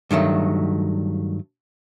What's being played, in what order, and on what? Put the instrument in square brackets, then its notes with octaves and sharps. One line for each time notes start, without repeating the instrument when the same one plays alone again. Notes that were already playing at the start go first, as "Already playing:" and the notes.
[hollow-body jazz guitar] G2 D#3 F#3 A3